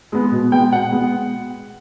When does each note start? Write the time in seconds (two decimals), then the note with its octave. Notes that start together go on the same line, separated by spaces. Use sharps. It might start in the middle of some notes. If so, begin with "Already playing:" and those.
0.12 G#3 B3
0.31 B2
0.52 G#3 B3 G5
0.72 B2 F#5
0.92 G#3 B3